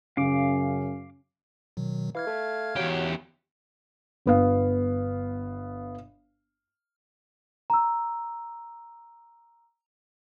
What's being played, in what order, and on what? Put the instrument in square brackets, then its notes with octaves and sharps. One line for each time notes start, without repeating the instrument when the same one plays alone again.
[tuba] F#2 [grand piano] C#3 [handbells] C#4 [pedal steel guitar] F5 D6
[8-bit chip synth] B2 D#3 F#3
[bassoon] E3 [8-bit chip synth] F5 F6 G#6
[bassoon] A3
[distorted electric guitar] E2 G4 [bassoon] F#3
[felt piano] G1 B3 F5
[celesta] A#5 E6